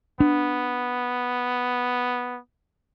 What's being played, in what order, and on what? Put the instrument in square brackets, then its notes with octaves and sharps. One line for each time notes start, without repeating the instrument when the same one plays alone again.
[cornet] B3 [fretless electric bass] D4